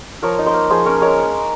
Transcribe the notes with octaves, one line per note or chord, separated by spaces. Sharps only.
F3 A#4 C#5
D#4
C5 D#5
A#3
F3 G#4 C5
C#4 A#4 C#5
G#3 A#4 C#5